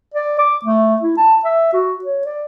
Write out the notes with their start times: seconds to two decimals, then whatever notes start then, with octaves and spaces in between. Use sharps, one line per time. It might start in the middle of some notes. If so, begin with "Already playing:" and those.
0.14 D5
0.39 D6
0.65 A3
1.02 E4
1.17 A5
1.45 E5
1.73 F#4
2.04 C#5
2.25 D5